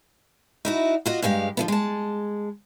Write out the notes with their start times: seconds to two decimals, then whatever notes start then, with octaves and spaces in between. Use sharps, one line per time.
0.65 D#4 E4 F#4
1.06 F4 F#4 D#5
1.22 G2 G#3 G4 F5
1.57 D3 F3 B3
1.68 G#3 A5